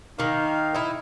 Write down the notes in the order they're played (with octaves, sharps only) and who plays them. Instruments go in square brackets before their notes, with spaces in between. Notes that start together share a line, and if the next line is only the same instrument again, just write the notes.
[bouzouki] D#3 A#3 [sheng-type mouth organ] D#4 F5
[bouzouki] D#4 E4